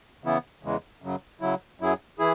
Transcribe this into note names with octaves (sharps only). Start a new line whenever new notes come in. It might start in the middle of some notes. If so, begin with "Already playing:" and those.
C#3 E3 B3 E4
E2 C#3 E3 G#3
F#2 C#3 F#3
C#3 F#3 E4
F#2 F#3 E4 G#4
E3 E4 G#4